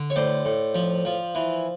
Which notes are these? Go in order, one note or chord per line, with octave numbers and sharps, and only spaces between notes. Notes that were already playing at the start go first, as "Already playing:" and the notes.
Already playing: D3
C#5
A2 C5 D5
A2
F3
F3
E3